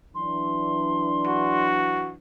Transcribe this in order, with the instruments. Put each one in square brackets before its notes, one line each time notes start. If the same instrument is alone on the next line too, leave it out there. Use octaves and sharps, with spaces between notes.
[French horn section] E3 F#3 D4 [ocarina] C6
[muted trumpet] F#4